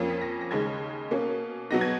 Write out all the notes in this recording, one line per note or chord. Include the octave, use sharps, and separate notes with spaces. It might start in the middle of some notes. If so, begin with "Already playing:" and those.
Already playing: F2 F3 A#3 C#4
B6
A#6
A#6
D#2 C#3 G#3 D#4 G#6
B2 A#3 C#4
B2 F#3 B3 D#4 A#6
G#6